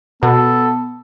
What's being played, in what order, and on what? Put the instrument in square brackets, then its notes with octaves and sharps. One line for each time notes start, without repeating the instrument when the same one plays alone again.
[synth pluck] B2 [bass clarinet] B3 [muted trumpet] A4